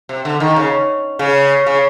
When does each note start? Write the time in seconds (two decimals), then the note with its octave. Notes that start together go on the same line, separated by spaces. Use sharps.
0.09 C3
0.25 D3
0.40 D#3
0.56 C#3
1.19 C#3
1.66 C#3